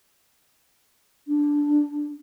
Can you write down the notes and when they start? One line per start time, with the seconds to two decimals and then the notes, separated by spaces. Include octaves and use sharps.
1.28 D4